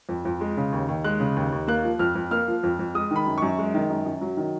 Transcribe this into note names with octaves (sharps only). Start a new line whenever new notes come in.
F2
F2
G#3
C#3
D#2
D#2
G#3 F#6
C#3
D#2
D#2
A#3 F#6
F3
F2 F6
F2
A#3 F6
F3
F2
F2
G#3 D#6
D#3 B5
F#2
F#2 C#6
G#3
D#3
F#2
F#2
F#3
D#3